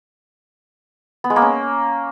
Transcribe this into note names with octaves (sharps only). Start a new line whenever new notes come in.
B3
G#3
A#3
C#4